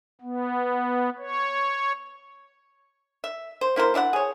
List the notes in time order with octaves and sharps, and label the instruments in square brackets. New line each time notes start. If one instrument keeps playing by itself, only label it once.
[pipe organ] B3
C#5
[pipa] E5
C5
A#3 E4 A#4 C5
D4 E4 E5 F#5
G#4 C#5